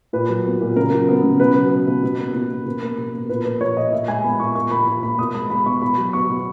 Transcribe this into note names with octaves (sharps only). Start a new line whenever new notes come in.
A#2 B4
F#3
B3
A#2
C#3 A#4
F#3
B3
C#3
B2 B4
F#3
B3
B2
B2
A#3
B2
A#3
B2
A#3
B2
A#3
A#2 B4
A#3 B4
A#2 C#5
A#3 D#5
A#2 E5
G#3 G#5
B3 B5
A#2 C#6
A#2 C#6
A#3 B5
A#2 B5
A#3 B5
B2 D#6
G#3 B5
B3 B5
B2 C#6
B2 B5
F#3
B3 C#6
B2